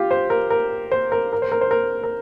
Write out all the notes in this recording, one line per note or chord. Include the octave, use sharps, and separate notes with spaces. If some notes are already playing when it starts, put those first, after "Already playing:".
Already playing: F4 G4
C5
A#4
A#4
C5
A#4
A#4
C5
A#4
C5
A#4
A#4